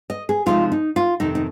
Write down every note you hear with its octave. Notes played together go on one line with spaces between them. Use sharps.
D#5
G#4
C3 F3 G#3 D#4 F4
D#4
F4
F2 C3 D#3 D#4
D#4